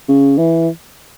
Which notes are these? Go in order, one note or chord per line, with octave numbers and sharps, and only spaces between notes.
C#3
E3